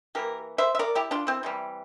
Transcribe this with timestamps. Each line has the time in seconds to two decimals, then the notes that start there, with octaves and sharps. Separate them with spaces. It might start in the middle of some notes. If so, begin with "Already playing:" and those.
0.15 E3 A#3 G4 A#4
0.58 C5 E5
0.75 E5
0.79 A#4 D5
0.95 E4 G4
1.11 D4 F4
1.27 C4 E4
1.43 C3 E3 G3